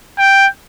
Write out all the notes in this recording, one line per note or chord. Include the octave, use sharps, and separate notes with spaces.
G5